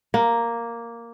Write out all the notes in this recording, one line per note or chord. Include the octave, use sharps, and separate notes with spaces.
A#3